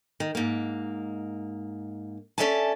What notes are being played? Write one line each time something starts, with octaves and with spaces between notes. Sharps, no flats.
D#3
G#2 A#3
C#4 A4 D5 E5 G#5 A5